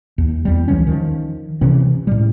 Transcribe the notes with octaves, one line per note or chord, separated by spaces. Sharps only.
D#2
E2 G3
C#2 E3 F3 C#4
D#3 F3
C3 E3 C4 C#4
A2 G3